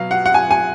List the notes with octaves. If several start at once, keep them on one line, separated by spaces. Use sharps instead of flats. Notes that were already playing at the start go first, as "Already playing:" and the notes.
Already playing: B2 F#3 F5
F#5
F#5
G#5
G#5